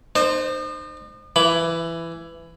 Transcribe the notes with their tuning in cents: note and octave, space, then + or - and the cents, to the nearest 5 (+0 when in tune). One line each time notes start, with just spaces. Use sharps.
D#4 -40 C5 +0
E3 +15 B5 +10